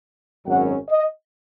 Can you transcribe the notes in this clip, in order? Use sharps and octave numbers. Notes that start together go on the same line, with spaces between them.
G#1 F#2 F#3 C#4 F#5
D#5